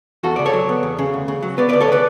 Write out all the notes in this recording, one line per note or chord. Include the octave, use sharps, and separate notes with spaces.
E2 F#4 A4
C#3 D5
A4 C#5
F#3
B3
E2
C#3
D2
C#3
F#3
B3 B4 D5
D2 B4 D5
A4 C#5
C#3 B4 D5